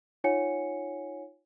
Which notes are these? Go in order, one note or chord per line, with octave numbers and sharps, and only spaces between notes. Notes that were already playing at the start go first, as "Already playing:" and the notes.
D#4 F4 C#5 F#5 G#5 C#7